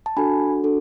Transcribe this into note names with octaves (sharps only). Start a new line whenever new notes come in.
A5
D4 F#4 A4 G#5 B5
D4 F#4 A4